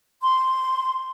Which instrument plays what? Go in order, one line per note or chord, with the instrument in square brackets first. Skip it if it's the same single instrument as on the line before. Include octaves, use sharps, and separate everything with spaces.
[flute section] C6